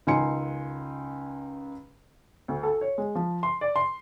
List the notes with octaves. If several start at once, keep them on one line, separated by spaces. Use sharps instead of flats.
C#2 D#3 D#4 G#5 C6 C#7
D2
A4
C#5
G#3
F3
C6
D5
C6